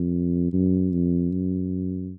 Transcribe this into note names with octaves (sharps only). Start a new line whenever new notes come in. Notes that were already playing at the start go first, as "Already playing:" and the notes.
Already playing: F2
F#2
F2
F#2